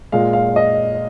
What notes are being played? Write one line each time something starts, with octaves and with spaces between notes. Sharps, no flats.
A#2 G#3 F5
F5
D#5